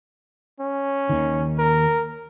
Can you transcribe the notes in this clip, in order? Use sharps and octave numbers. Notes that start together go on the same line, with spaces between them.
C#4
D#2 D#3
A#4